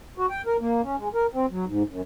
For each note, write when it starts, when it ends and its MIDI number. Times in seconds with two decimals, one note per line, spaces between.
0.18 0.26 66
0.30 0.42 79
0.46 0.57 70
0.61 0.81 58
0.83 0.96 61
0.98 1.09 56
1.14 1.26 70
1.33 1.46 60
1.51 1.65 54
1.67 1.83 44
1.89 2.01 42